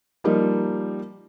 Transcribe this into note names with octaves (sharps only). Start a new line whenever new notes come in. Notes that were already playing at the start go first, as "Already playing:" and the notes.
F3 G3 A#3 D#4